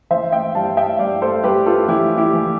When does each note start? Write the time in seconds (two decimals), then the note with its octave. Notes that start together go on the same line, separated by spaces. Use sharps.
0.10 E3 C5 E5
0.32 E5 G5
0.55 G2 F5 A5
0.77 E5 G5
0.99 G2 D5 F5
1.22 A4 C5
1.43 G2 G4 B4
1.66 F4 A4
1.88 E3 E4 G4
2.18 E4 G4
2.33 E3